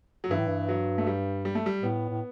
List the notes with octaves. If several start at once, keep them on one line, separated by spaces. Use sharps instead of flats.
F#3
G2 E3
A2
G2
F#3
A3
G3
G3
A3
G3
A2 B3
A2